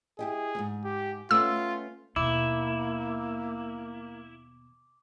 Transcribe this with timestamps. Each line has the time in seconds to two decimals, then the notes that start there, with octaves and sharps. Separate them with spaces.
0.19 E4 G4 G#4 D#5
0.55 E2 G#2
0.84 G4
1.31 A3 B3 C#4 F4 E6
2.16 D#2 B2 A#3 E4 D6